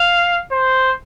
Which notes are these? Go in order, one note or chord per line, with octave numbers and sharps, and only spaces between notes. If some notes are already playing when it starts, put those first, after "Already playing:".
Already playing: F5
C5